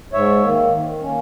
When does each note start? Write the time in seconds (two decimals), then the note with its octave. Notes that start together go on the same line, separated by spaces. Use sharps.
0.13 G#2 C#5 E5
0.43 D#3 A#3
0.72 D#3
1.02 A#3 C#4